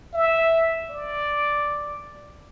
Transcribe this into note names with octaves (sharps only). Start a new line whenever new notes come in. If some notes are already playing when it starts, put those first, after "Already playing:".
E5
D5